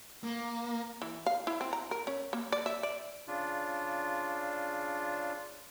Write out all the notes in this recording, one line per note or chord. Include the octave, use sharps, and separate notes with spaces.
A#3
E3
F5
E4
C4
A#5
A#4
C#4
A#3
D5
E5
D5
C#3 D4 F4